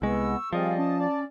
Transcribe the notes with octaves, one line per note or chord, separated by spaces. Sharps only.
C2 G#3 B3 C#6 E6
F3 G3 C4 G#4 D5 D#5 F5
C#4 A5
D5